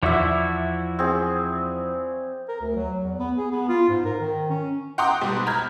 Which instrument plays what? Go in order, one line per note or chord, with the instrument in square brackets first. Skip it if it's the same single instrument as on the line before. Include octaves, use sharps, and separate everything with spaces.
[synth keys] E2 [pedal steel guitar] F3 E4 F#4 [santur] D5 E5
[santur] C4 G#4
[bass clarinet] A#4
D2
F#3
E2
B3
G#4
B3
F4
G#2
A#4
D#3
C#4
[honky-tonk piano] F#5 G5 A#5 C6 D6 D#6
G#2 B2 G3
A#5 B5 F6 G6 G#6